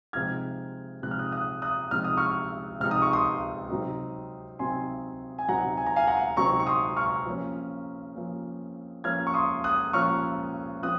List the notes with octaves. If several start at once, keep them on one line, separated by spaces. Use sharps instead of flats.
C3 F3 G#3 D#4 F6 G#6
C3 F3 G#3 D#4 F#6
F6
D#6 F#6
D#6 F#6
D#6 F#6
C3 F3 G#3 D#4 F6
D#6
C#6 F6
C3 F3 G#3 D#4 F6
D#6
C#6
C6 D#6
C3 F#3 C4 D#4
C3 F#3 C4 D#4 G#5 C6
G#5
C3 F#3 C4 D#4 F#5 A#5
G#5
A#5
F5 G#5
F#5 A#5
C3 F#3 C4 D#4 A#5 C#6
C#6
C6 D#6
C#6 F6
F3 A#3 C#4
F3 A#3 C#4
F3 A#3 C#4 F6 G#6
C#6
C6 D#6
D#6 F#6
F3 A#3 C#4 C#6 F6
F3 C4 D#6 F#6